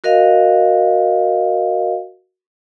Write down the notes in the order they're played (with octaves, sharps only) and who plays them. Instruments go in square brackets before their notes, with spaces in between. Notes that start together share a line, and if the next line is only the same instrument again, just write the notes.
[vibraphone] F#4 A#4 D#5 F5